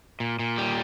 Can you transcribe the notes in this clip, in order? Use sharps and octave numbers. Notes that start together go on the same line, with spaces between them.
A#2
A#2
G3